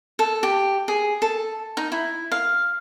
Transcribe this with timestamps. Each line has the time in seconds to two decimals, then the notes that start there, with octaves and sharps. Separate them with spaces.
0.19 A4
0.43 G4
0.88 G#4
1.22 A4
1.77 D#4
1.92 E4
2.32 F5